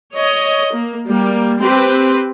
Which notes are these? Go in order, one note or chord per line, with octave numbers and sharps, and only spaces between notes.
C#5 D#5
A#3
G3 A#3
C4 G4 B4